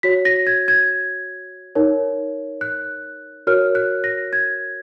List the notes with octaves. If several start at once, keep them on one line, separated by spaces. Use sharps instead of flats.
F#4 C#5 B6
A#6
G#6
G#6
D#4 A#4 C#5
F#6
F#4 A#4 C#5 F6
F#6
A#6
G#6